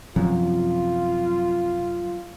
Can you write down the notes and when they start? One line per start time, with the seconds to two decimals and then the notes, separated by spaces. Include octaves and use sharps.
0.16 F#2 C3 F3 F4